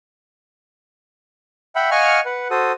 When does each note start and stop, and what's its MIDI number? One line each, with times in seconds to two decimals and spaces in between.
1.75 1.90 76
1.75 1.90 78
1.75 1.90 79
1.75 1.90 83
1.91 2.20 75
1.91 2.20 77
1.91 2.20 78
1.91 2.20 80
1.91 2.20 85
1.91 2.20 89
2.25 2.48 71
2.25 2.48 78
2.51 2.72 66
2.51 2.72 69
2.51 2.72 72
2.51 2.72 87